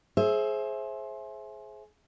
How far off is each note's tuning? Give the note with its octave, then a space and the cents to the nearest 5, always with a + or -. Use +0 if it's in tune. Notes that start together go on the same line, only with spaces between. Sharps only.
G#4 +25 C5 +25 E5 +0